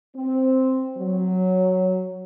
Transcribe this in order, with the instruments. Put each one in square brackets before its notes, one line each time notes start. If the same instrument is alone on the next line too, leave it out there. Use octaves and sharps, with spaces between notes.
[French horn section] C4
F#3